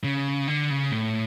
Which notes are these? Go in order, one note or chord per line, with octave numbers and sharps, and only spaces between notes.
C#3
D3
C#3
A2